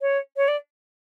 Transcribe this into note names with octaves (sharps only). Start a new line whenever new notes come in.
C#5
C#5
D5